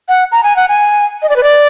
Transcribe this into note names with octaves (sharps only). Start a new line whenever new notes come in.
F#5
A#5
G#5
F#5
G#5
D#5
D5
B4
D5